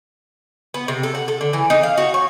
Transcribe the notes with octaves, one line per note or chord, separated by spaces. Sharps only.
B3
C3
A4
F#5
A4
D3
E3
D#4
F5
F#4
C#5